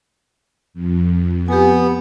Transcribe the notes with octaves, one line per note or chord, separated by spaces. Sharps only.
F2
B3 G4 G#5